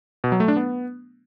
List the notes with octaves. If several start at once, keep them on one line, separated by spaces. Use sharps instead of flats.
B2
F#3
A3
D4
B3